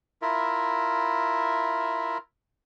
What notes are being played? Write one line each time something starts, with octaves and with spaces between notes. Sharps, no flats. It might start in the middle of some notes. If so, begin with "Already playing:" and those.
E4 F4 A#4 E5